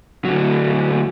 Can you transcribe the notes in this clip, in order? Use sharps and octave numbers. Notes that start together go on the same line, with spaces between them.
D2 F#3